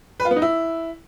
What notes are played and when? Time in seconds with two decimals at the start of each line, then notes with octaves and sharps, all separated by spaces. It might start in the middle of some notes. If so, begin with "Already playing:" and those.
0.20 B4
0.25 F4
0.31 B3
0.36 D#4
0.42 E4